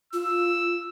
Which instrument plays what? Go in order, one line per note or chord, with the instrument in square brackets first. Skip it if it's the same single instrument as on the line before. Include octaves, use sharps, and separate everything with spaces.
[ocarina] F4 [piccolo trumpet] E6